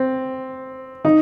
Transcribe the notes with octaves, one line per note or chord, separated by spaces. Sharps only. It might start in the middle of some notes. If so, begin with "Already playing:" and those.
Already playing: C4
D#4